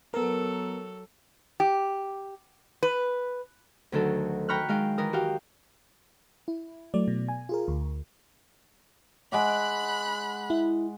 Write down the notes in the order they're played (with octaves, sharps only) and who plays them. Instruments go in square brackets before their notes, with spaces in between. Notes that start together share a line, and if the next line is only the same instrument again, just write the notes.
[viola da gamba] F#3 A4 [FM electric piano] B3 A#4
[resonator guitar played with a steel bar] G4
B4
[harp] D2 D3 D#3 F#3 A4
G5 A#5 B5 C#6 F6 F#6
D#3 G#3 F5 G5
D#3 E3 A#4 D#6
F#4 G4 F5 G5
[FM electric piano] E4
F#3 A3 D5
B2
G#5
F4 G#4 A#4
D2
[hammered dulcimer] G#3 F#5 D6 [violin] B5 F#6
[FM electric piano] E4